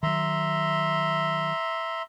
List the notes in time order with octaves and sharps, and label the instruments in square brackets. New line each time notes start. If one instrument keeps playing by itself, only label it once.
[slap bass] D#3 F#3 [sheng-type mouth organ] E5 A#5 C6